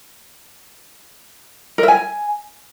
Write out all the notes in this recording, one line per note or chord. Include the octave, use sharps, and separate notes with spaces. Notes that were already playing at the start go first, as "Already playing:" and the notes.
A#4
E5
G#5